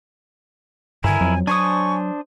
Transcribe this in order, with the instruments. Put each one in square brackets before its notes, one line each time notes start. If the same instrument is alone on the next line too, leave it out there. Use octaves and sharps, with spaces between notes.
[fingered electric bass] G2 D3 [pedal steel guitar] E4 A#4 [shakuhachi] G#5
[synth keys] F2 [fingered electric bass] F#3
[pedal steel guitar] D4 C5 D#6 [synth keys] G#5 [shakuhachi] C#6